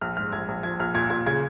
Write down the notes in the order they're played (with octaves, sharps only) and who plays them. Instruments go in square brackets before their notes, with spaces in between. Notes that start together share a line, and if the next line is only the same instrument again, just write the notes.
[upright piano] A#1 F6
G#2 F6
A#1 G#6
A#1
F3 G#6
A#1 F6
A#2 G#6
A#2 G#6
C#3 G#6